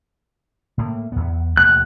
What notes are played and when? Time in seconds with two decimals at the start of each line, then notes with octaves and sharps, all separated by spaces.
0.78 A2 A#3
1.12 E2 B3
1.57 E1 D#2 A3 F#6